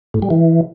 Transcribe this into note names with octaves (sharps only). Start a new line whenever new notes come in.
A2
G3
E3